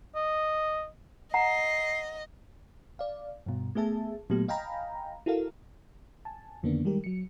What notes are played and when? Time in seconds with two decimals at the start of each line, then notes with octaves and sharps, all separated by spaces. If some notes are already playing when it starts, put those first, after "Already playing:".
0.15 D#5
1.34 D#5 F#5 A#5 C7
2.99 D5 F5
3.46 G2 B2
3.75 A3 B3 G#4 E5 A5
4.30 A#2 F#3 A3 B3 G4
4.48 D#5 F5 G5 G#5 A#5 B5
5.26 E4 F#4 A4 A#4 F5
6.25 G#5 A5
6.63 F2 D3 D#3 A#3 B3 D4
6.85 D#3 G3 G#3 G4 A#4
7.04 F#3 C#7